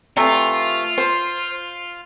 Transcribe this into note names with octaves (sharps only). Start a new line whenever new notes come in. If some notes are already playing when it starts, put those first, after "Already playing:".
C3 E3 A3 F4
C5